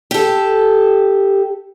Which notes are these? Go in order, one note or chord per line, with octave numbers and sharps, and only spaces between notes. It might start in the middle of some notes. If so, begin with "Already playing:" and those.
G4 A4